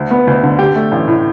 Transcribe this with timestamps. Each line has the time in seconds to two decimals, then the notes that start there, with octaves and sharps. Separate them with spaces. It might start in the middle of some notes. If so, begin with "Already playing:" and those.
Already playing: D2
0.11 B3
0.27 D2
0.43 D3
0.59 G4
0.75 A3
0.92 A1
1.08 A2